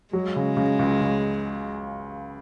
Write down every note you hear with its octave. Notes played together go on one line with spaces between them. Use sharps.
F#3 G#3
C#3
C#3
C#2
C#3